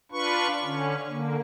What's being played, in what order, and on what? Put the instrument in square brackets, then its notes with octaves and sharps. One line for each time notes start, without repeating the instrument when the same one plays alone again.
[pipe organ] D4 F4 B4 C#6
D3 C#4
D3 A#3